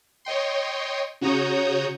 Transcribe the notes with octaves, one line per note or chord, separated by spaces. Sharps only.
C#5 D#5 G5 C6
C#3 F#4 C#5 A#5 D#6 G6